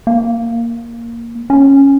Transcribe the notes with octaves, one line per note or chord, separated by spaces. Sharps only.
A#3
C#4